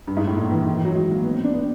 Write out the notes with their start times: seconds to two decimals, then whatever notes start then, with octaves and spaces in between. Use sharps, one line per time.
0.07 G2
0.17 G#2
0.27 A2
0.37 A#2
0.45 D#3
0.51 E3
0.66 D#3
0.76 E3
0.85 F#3
0.95 G#3
1.10 A#3
1.25 B3
1.33 C4
1.44 D4
1.53 B3